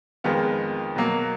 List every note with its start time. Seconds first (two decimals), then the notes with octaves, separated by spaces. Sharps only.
0.24 F2 D#3 G#3 B3 F4
0.96 B2 F#3 A#3